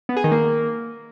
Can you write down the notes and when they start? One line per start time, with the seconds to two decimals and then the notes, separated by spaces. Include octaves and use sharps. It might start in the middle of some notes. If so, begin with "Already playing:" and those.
0.09 B3
0.17 G#4
0.24 D#3
0.32 A#3